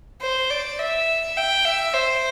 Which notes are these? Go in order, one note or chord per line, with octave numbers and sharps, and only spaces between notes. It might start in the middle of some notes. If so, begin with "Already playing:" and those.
C5
D5
E5
G5
E5
C5